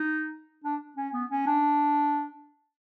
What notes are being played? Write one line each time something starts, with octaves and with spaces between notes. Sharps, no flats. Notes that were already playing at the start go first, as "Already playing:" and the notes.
Already playing: D#4
D4
C#4
B3
C#4
D4